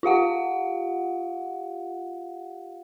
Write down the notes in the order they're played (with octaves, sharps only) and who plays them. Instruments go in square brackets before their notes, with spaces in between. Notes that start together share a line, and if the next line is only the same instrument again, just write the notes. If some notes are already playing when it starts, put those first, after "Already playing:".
[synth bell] F4 G4 F5 F#5